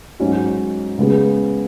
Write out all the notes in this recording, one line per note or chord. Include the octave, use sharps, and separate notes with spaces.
G#2 F#3 C#4 F#4
C#3 G#3 B3 G#4